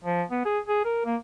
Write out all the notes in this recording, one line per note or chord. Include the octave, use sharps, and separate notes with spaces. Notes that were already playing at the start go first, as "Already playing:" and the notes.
F3
B3
G#4
G#4
A#4
A#3